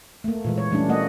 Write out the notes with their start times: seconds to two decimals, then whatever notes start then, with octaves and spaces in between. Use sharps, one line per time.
0.24 A3 A#3
0.45 A#2 E3 G#3
0.58 C#5
0.71 E3 G3 A3 C#4 D4
0.89 A3 A#3 D#5 F#5